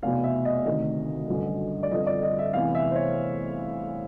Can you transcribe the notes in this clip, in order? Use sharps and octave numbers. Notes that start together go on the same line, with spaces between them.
F1 E2 B2 F5
E5
D#5
D2 C3 D#3 D#5
G1 F#2 D3
D5
G1 F2 D3 D#5
D5
D#5
E5
F1 E2 C3 E3 F5
E5
C5
C#5